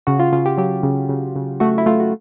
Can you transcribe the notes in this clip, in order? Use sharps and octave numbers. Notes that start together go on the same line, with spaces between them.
C#3 F#4
F4
C#3 F4
G4
F#3 G4
C#3
C#3
C#3
A3 F#4
E4
A3 F4
F#4